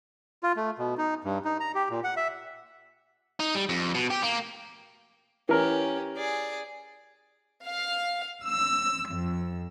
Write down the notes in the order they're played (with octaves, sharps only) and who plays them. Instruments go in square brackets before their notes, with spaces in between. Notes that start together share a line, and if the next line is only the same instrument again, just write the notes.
[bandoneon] F4
A3
B2
D#4
G2
D#4
A#5
G4
A#2
F#5
E5
[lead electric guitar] D#4
G3
F2
B2
G4
A#3
[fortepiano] E3 A#4 [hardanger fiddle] C#4 G4
[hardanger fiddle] G#4 D5
[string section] F5
E6
F2